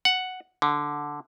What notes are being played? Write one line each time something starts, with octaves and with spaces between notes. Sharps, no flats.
F#5
D3